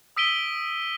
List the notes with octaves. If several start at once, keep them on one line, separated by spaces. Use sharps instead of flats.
D#6 E6 B6 D7 D#7 G7